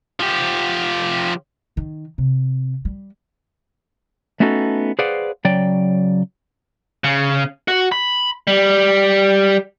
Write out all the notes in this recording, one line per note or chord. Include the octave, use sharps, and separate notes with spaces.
F3 G4
D#3
C3
G3
A3 B3 C#4 D#4 F#4 A4
G#4 B4 C5 D5 F5 F#5
C#3 F#3 D5 G5
C#3
F#4
B5
G3